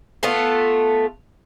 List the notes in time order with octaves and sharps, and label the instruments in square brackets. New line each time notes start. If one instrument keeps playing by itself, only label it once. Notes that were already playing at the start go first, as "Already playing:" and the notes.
[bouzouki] A3 B3 F4 A4